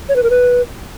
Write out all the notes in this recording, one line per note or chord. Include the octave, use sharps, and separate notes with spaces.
C#5
B4
A#4
B4